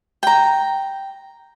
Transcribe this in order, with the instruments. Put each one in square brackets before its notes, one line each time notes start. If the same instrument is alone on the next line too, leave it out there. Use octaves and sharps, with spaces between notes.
[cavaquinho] G5 A#5